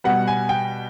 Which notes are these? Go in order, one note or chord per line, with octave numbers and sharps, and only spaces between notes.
B2 G3 B3 F#5
G#5
G5